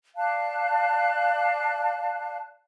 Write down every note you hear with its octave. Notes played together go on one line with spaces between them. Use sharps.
D5 F5 A5 F#6